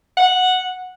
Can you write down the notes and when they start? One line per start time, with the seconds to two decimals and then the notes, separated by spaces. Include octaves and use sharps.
0.17 F#5